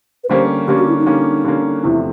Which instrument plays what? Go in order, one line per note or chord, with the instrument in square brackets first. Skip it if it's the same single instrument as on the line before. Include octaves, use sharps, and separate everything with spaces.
[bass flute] B4
[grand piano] D3 G3 A#3 C#4 [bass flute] C5
[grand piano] D3 G3 A#3 C#4 [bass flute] G4
[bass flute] F#4
E4
D#4
[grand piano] D3 G3 A#3 C#4
D3 G3 A#3 C#4
[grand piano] E2 C3 F3 A3 [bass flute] E4